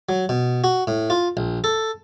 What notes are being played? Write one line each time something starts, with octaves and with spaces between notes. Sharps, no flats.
F#3
B2
F#4
A2
F4
A#1
A4